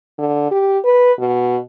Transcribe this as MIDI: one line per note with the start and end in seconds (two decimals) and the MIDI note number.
0.18 0.48 50
0.51 0.79 67
0.85 1.13 71
1.19 1.58 47